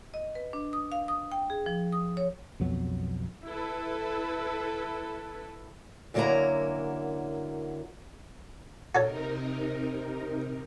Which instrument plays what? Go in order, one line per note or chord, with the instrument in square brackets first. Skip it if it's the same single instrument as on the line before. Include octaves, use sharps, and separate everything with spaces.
[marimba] D#5
B4
D4
D#6
F5
D#6
G5
G#4
F3
D#6
C#5
[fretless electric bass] B1 F2 F#3 B3
[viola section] E4 A4 B4
[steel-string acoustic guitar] F#2 D3 F#3 A#3 E4 A#5
[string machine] C3 D#4 A#4 [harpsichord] F#4 A4 C#5